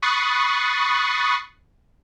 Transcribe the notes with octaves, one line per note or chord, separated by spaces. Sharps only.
B5 C#6 D#6 F#6 A6 C7